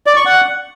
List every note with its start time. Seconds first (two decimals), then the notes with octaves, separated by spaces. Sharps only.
0.06 D5
0.16 C#6
0.26 F#5